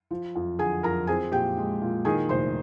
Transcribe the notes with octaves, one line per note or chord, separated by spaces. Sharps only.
F3
F2
D3 G#4 G#5
F2 A#4 A#5
C4 G#4 G#5
A#2 G4 G5
G#3
A#2
D#3 G#4 G#5
F1 C5 C6